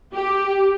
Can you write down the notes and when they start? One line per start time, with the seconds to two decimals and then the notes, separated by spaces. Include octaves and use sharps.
0.13 G4